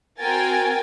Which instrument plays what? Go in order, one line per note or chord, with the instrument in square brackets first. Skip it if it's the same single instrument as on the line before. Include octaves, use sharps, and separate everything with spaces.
[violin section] C4 F#4 A#4 G5 G#5 A6